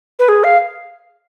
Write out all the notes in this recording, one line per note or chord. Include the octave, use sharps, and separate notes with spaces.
B4
G#4
F5